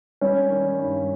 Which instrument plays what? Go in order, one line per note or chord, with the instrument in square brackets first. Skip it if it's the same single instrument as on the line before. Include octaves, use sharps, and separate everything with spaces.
[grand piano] G3 [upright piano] C#4
[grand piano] D#3
G2